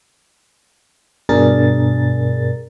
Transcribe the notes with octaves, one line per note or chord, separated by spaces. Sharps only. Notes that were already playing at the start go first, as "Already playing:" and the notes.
G2 B2 D4 G#4 A#4 A6